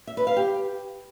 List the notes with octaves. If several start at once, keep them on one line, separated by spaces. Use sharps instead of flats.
E5
B4
F5
G4